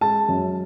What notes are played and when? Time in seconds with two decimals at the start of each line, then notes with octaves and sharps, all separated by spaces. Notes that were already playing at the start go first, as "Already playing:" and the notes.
0.01 G#3 A5
0.28 F#2